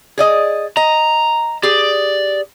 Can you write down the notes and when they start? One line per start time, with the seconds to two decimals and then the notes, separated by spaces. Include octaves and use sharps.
0.18 G#4 D5 D#5
0.77 D#5 A#5
1.63 G4 G#4 D5